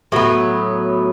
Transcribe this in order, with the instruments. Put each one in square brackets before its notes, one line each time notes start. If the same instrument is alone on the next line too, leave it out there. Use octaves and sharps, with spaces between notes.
[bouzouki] A2 F#3 B3